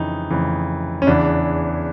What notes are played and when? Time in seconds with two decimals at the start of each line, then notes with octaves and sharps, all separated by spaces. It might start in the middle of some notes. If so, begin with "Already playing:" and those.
Already playing: F2 C#3 E3 D#4
0.30 F2 C#3 E3
1.02 C#4
1.07 E2 C#3 E3 D4